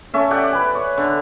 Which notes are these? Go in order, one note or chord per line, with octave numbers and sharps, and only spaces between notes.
A3 C#4 E5
G4 D5 F#5
B4 G#5
C#5
D3